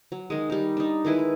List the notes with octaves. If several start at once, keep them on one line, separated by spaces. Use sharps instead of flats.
F#3
D#3 G#3
G3 D#4
D4 D#4
D#3 G#3 E4 B4
B4